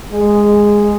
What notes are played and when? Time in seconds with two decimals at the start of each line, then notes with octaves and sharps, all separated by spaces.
0.12 G#3